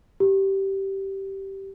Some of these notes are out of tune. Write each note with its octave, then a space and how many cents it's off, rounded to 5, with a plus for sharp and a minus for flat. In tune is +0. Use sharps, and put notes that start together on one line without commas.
G4 -15